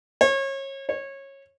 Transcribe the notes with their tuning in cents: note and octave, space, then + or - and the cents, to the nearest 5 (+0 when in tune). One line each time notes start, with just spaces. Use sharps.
C#5 -30
C#5 -20